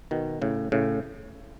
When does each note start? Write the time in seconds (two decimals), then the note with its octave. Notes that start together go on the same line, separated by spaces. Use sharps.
0.11 B2 D#3
0.42 A2 C#3
0.72 A2 C#3